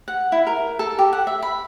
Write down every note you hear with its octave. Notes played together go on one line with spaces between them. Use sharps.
F#5
E4
A#4
A4
G4
F#5
E5
B5